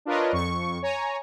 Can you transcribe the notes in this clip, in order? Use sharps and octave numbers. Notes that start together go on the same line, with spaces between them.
D4 F4 A#4 B4 C#5 D#5
F2 C#6
C#5 G#5 A#5